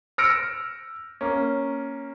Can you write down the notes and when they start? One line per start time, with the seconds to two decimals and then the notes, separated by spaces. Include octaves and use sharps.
0.18 E6 F6 A#6 C#7 D7
1.21 A#3 C#4